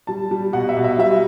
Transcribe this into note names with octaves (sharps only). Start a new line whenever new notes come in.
G3 A5
G3
B2 F#5
E5
B2
E5
G3 E5